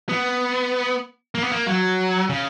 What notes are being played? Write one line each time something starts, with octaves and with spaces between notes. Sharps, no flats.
B3
A#3
B3
A#3
F#3
C#3